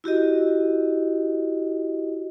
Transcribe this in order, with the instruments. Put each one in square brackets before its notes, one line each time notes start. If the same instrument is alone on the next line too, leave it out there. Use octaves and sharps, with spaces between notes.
[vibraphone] E4 F#4 G4 D#5